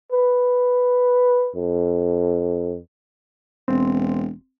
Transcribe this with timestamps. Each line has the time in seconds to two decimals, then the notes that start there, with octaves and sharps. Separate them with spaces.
0.12 B4
1.56 F2
3.68 E1 C4